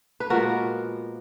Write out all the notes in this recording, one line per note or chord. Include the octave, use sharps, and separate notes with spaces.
B4
A#2 F3 G#3 B3 F#4 A#4